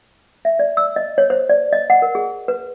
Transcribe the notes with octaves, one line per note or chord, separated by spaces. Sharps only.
E5
D5
E6
D#5
C#5
C5
D5
D#5
F#5
A#4
G#4
B4